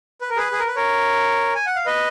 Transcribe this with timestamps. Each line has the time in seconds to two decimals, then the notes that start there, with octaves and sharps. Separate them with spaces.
0.21 B4
0.30 A#4
0.36 G#4 B4
0.52 G#4
0.59 A#4
0.67 B4
0.76 A#4 C#5
1.55 G#5
1.66 F#5
1.76 F5
1.86 B4 D#5